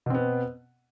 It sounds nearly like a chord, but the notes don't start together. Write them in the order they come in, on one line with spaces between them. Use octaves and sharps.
B2 C4 B3